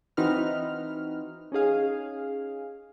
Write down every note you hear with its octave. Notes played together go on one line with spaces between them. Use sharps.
E3 C4 D#4 F#4 B4 F6
C#4 D#4 G#4 F5